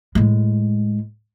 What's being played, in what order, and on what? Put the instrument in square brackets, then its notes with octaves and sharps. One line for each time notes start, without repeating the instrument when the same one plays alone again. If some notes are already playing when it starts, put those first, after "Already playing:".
[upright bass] A2 G#3